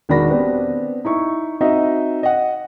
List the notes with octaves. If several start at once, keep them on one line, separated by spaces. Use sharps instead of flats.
E1 D#3 D4 F#4 B5 A#6
B3 C4 D4 G4 B4
D#4 E4 C#6
C4 D#4 F#4 D#5 E5
D#5 F#5